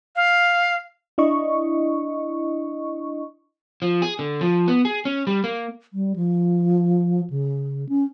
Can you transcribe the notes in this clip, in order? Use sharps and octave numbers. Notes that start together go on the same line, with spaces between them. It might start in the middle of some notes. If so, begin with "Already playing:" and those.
F5
D4 E4 D#5 C#6
F3
G#4
D3
F3
B3
G#4
C#4
G3
A#3
G3
F3
C#3
C#4